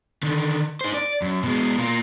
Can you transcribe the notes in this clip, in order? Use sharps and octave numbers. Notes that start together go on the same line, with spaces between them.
D3 D#3
D#4 C5
D5
F#2
B2 G#3
A#3 F4